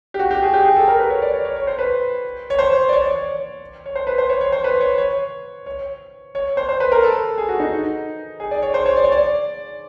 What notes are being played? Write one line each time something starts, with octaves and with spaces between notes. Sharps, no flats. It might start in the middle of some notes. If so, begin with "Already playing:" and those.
G4
F#4
G4
G#4
G4
G#4
A4
A#4
B4
C#5
D5
C#5
C#5
C#5
C5
B4
C#5
C5
D5
C#5
D5
C#5
C#5
C5
B4
C5
C#5
C#5
C5
B4
C#5
C#5
C#5
C#5
C5
C5
B4
A#4
A4
G#4
F#4
D#4
G#4
D5
C#5
C5
C#5
D5
C#5
D5